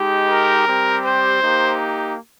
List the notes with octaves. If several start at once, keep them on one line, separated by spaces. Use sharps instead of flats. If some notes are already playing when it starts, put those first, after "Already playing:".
Already playing: G#3 D#4 G4
A#4
G3 C4 G4
C5
A#3 D#4 G4